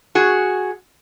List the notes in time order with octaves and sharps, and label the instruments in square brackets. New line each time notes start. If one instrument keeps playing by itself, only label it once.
[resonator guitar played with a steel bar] F#4 G#4